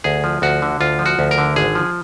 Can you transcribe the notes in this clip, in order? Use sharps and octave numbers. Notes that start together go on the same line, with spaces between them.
D2 G#4
F3
D2 F#4
D3
D2 F4
F3
F#4
D2
A#4
D3
G#1 G#4
F3